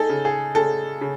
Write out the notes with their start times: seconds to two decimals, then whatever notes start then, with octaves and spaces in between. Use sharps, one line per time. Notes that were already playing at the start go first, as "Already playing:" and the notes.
Already playing: D#4 G#4 A4
0.09 C#3
0.25 G#4
0.55 C#3 A4
1.01 C#3